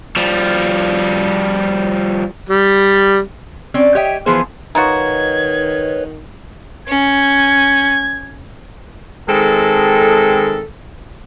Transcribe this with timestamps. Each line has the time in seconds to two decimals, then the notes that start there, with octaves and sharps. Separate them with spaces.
0.16 F3 G3
2.49 G3
3.74 C4 C#4 D5
3.95 G4 C#5 D#5 E5 G5
4.26 E3 F3 B3 G#4 C5
4.75 D#3 D#4 F4 F#4 B4 C#5 G#6
6.88 C#4 G#6
9.29 D#3 G#3 C4 A4